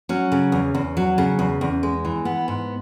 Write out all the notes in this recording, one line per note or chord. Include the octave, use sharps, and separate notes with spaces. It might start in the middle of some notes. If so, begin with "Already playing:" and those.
F#3 C#4
C#3
E2
E2
F#3
C#3
E2
E2
G#3
E3
B3
G#2